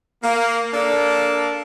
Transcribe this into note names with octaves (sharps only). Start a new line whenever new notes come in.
A#3
A#3 D4 A4 D5 A5